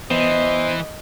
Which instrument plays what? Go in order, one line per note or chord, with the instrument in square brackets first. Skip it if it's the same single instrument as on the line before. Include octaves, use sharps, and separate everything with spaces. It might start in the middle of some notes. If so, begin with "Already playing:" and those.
[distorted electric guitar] E3 [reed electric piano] B3 [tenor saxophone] C5 [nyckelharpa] D#5